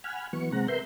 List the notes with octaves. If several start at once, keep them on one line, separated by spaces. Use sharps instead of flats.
F#5 G#5 B5 F6
E3 F#3 B3 C#6
C3 G#3 C4 F#5 A#5
A#4 B4 E5 C6 G6